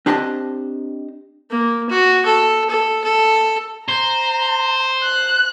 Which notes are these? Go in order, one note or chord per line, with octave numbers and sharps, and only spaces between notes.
C4 D4 G4 C5 D#5 A5
A#3
F#4
A4
A4
A4
C5 A#5
F#6